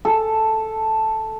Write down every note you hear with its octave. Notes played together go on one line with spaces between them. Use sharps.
A4